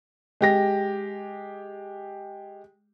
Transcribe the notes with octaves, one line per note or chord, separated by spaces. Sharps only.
G#3 G4 A#6